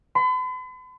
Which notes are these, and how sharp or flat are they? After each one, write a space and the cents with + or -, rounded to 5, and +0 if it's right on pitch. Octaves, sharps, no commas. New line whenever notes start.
B5 +45